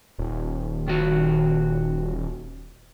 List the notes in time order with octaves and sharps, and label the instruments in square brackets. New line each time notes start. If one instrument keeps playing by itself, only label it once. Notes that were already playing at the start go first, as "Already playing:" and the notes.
[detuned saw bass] D#1
[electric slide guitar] D#3 F#4